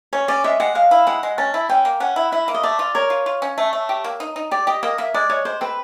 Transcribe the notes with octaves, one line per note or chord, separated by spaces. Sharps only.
C#4 C#5
C#4 D5
G#3 E5
G#3 F#5
G#3 F5
E4
G#3 F#5
G#3
C#4 A5
E4
C#4 G5
A#3
C#4 F#5
E4
E4 E5
A#3
D#5
A3 D5
F4
A#4 C#5
F4
F4
C#4
A3
A3
G4
A#3
D#4
D#4
G4 D5
G4 D#5
A#3 D#5
A#3 E5
G#3 D5
G#3 C#5
G#3 C5
C4 B4